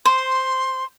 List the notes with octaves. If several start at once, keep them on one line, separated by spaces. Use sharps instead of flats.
C5 C6